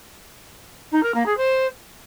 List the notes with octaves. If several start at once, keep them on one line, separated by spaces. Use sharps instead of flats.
D#4
A#4
A#3
G#4
C5